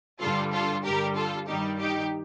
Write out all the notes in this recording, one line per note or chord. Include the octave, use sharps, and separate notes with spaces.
G2 D3 G3 F4 A4
F4 A4
G2 D3 G3 G4 A#4
F4 A4
G2 D#3 G3 D#4 G4
D#4 G4